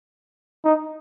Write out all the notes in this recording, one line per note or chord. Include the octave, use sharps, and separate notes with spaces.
D#4